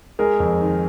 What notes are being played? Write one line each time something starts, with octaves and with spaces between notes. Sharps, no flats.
G#3 G#4 A#4
F2
D#3